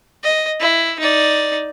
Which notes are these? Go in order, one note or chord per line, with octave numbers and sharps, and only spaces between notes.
D#5
E4
D#4 D5